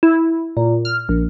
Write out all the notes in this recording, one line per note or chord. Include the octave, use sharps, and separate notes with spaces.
E4
A#2
F6
A#1